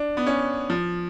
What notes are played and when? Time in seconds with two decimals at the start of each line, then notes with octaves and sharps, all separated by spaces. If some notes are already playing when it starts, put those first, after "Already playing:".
Already playing: D4
0.17 B3
0.26 C#4
0.70 F3